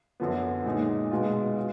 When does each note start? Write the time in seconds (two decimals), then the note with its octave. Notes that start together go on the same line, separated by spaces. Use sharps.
0.20 F#2 D3 F3 B3
0.65 A#2 G#3 D#4
1.11 B2 G#3 B3 F4
1.57 F4